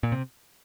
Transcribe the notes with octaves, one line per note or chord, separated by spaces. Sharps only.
A#2
C3